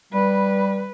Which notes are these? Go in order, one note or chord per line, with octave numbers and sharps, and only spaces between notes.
G3 B4